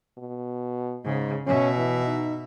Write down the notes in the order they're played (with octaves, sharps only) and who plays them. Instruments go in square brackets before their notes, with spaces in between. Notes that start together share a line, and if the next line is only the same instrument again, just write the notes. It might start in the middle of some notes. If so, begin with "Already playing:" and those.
[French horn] B2
[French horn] G#2 [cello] C#3
[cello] B2 E5 [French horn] C#4
[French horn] E3
D#4